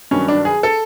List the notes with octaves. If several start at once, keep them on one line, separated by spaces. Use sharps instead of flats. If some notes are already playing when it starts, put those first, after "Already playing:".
G2 D#3 F#3 C#4
D4
G#4
A4